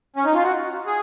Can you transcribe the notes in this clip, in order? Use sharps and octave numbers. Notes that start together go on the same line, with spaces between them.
C#4
D#4
F4
F#4
G#4